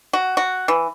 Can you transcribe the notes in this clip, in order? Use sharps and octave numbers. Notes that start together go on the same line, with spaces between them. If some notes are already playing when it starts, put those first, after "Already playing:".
F#4
F#4
E3